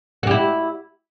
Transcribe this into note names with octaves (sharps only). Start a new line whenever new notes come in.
E4 F#4 G4